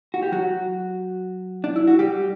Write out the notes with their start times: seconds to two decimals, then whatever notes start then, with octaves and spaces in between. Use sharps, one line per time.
0.14 F#4
0.23 G4
0.32 F#3 F#4
1.64 D4
1.76 E4
1.87 F#4
1.99 G3 G4